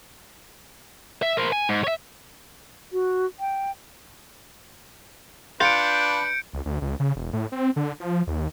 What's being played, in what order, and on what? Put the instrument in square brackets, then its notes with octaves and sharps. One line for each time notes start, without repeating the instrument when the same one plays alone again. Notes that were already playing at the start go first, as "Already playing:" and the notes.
[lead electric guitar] E5
A#4 C5
G#5
G#2
C#5 E5
[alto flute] F#4
G5
[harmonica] D4 B4 [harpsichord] F4 [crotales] G6 C#7 D7
[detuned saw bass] C#2
D2
C#2
C#3
E1
A2
C4
D3
F3
D#2